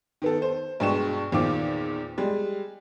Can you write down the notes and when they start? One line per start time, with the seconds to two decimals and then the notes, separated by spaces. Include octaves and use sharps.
0.22 D#3 B3 A4
0.42 C5
0.80 G2 B2 G#3 G5 C#6 E7
1.32 E2 A#2 D#3 C4 F4 D6
2.18 G3 G#3